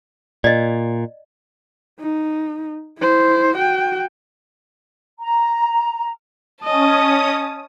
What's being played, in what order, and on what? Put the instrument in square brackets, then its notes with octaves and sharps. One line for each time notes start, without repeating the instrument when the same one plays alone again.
[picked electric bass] A#2 [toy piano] D5 D#5
[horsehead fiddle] D#4
E4 C5
F#4 G5
[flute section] A#5
[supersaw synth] C#4 D#6 [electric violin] D#5 [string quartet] A5